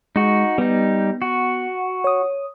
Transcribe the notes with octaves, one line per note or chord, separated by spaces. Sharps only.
G#3 D#4 F#4
G3 B3 D#4
F#4
C#5 D#6